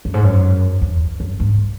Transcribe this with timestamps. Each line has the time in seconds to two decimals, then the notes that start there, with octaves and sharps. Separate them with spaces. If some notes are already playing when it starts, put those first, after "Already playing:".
0.05 F#2
0.14 G#2
0.24 F#2
0.81 E2
1.20 F#2
1.40 G#2